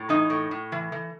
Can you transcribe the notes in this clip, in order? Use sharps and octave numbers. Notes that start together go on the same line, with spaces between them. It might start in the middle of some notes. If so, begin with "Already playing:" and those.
Already playing: A2
E3 D#4
A2
A2
E3
E3